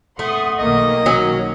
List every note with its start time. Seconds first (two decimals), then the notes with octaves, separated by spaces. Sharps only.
0.19 A3 F#5 C6 D#6
0.58 B1 D#3 A#3 D#5
1.06 F#3 C#4